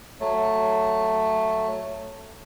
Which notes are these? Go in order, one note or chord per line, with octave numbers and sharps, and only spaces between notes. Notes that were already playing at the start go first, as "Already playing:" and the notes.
F#3 A3